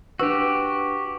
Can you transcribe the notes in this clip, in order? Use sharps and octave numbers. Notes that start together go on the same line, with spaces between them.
D4 F#4 G4 B4 E6